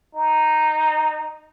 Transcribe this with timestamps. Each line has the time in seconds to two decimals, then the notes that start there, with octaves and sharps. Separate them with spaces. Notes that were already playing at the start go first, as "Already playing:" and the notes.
0.15 D#4